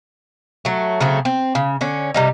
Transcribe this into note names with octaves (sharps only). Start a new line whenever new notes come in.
F#3 A3
C#3 F#3 A3 C4
C4
C#3
D3 C#4
C3 G3 D#4